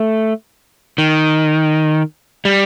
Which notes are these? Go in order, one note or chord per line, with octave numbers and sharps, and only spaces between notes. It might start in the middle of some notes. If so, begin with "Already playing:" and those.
Already playing: A3
D#3
G3